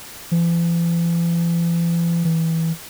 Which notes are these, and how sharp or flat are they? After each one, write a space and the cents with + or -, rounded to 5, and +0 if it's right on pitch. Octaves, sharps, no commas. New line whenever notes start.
E3 +45
E3 -15